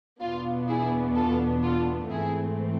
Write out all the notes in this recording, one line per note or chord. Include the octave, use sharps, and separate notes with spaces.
E2 B2 B3 D4 F4
E4 G#4
F4 A4
F4 A4
G#2 E3 A3 C4 E4 G#4